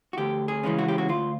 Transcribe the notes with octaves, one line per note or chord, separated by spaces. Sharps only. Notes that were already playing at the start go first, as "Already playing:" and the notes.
F#4
D2 G4
G#4
C#3 E3 G#3 C#4
F#4
G4
F#4
D2 F4